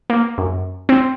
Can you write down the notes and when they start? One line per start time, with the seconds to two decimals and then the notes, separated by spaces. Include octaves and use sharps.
0.10 A#3
0.38 F#2
0.89 C4